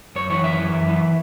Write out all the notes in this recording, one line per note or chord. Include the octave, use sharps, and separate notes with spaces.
F#2 C#5
E3 C#5
F#2 E5
E3
F#2
E3